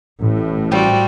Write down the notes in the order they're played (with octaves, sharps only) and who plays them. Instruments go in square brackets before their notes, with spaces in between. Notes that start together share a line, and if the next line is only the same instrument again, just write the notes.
[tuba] A1 [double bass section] A2
[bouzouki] F3 C4 [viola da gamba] G3 F#4